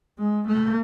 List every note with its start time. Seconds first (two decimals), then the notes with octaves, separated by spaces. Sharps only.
0.19 G#3
0.47 A3